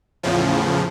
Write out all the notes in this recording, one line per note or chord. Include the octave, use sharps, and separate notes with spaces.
E2 A2 C#3 F3